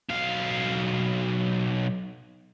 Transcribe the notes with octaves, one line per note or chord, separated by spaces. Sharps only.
B1 F5